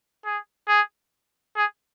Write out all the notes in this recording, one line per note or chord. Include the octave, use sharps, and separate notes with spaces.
G#4
G#4
G#4